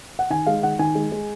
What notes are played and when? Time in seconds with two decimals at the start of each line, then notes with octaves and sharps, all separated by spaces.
0.19 F#5
0.30 D#3 G#5
0.46 G#3 F5
0.63 D#3 F#5
0.79 D#3 G#5
0.95 G#3
1.12 G#3